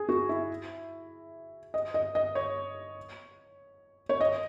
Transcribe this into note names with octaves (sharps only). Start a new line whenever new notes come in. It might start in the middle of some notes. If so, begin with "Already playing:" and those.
Already playing: G#4
F#4
E4
D#5
D#5
D#5
C#5
C#5
D#5